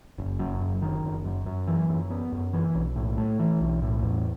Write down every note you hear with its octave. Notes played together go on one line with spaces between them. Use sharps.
F#1
F#2
F#1
D#3
F#1
F#2
F#2
E3
F#2
B3
F#2
E3
B1
A2
A3
E3
B1
A2
E2